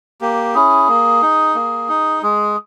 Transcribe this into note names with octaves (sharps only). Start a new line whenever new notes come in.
A#3 G4
C#4 E4 G#4
A#3
D#4
A#3
D#4
G#3 G#4